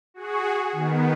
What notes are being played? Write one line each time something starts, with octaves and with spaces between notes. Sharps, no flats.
F#4 G#4
D#3 B3